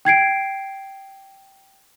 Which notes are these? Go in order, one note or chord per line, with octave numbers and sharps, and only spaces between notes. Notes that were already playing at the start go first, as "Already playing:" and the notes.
G5 G#6 C7 D7